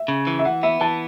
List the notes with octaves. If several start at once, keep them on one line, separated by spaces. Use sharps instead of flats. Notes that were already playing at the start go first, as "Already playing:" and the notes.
Already playing: E5
C#3
E3
E5
E3 F#5
B3 E5
E3 A5